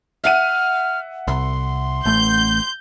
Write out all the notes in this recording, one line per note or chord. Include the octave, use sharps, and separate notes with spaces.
E5 F#5 F6 D#7
C2 C6
A1 A3 G6